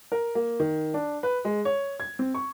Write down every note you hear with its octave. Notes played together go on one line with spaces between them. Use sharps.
A#4
A#3
D#3
D4
B4
G#3
C#5
G#6
C4
C#6